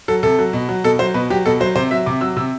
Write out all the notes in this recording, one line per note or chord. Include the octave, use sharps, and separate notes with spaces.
F#3 A4
C3 A4
F#3
B2
F#3
B2 A4
F#3 C5
B2 B4
F#3 G4
B2 A4
F#3 C5
C3 C5
F#3 E5
C3 D6
F#3 E6
C3 E6